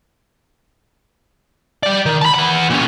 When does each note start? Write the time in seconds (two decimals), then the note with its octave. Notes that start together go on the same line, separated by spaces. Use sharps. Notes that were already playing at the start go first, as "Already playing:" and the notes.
1.83 G3 D5
2.06 D#3
2.22 A5 B5
2.34 E3 F#5
2.70 A#2 C#4